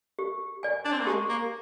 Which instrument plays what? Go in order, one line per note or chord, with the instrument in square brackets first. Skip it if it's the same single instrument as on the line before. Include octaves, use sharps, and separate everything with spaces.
[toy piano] G4
D5 G#5
[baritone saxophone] D4
C4
A#3
[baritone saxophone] G#3 [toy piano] G4
[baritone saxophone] A#3